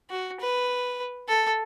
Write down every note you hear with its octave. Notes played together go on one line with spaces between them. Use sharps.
F#4
B4
A4